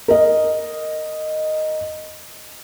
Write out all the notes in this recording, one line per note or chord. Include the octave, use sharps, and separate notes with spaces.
A#4 D#5